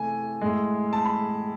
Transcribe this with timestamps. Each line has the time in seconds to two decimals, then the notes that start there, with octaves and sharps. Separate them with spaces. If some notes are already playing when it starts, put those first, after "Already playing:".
Already playing: C3 E3 A3 G#5
0.42 A2 G#3
0.93 A5
1.05 B5